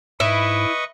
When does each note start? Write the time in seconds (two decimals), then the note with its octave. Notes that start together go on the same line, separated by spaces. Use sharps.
0.20 G#2 E4 B4 D#5 C#6